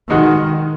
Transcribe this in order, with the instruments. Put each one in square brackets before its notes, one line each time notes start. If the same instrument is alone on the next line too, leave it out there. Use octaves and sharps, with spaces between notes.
[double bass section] D#3 [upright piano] G#3 D#4 F#4